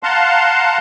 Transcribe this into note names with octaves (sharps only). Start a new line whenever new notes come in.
F5 F#5 A5 A#5 C6